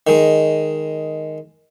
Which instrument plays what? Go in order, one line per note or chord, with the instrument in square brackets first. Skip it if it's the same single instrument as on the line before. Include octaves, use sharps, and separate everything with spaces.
[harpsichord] D#3 G#3